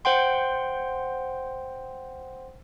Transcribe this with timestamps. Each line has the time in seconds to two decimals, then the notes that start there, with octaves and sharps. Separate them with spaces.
0.05 C5 F#5 G5 C6